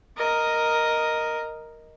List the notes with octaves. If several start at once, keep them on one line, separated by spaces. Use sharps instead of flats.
A#4 D#5